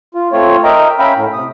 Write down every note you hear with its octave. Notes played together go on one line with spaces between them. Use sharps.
F4
A3 C4 F4 C#5
A#4 D#5 E5 G5 A#5
C#4 E5 F5 G5 A#5 B5
A2
C3 D#6